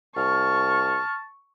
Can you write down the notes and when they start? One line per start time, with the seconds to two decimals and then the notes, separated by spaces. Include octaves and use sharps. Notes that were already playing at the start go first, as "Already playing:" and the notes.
0.16 C2 A5 C#6 F6